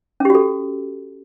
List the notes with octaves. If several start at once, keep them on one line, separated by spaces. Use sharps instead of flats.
C#4 F#4 G4 A4